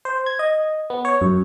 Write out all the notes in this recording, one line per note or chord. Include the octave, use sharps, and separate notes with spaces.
C5
G#6
D#5
B3
C#5
F#2